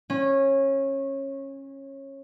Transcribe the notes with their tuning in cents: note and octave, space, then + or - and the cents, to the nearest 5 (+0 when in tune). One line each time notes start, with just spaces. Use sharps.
C#4 -20